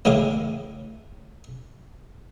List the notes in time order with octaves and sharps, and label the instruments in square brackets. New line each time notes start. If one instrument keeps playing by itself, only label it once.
[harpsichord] A1 A2 C#3 G#3 A#4 D6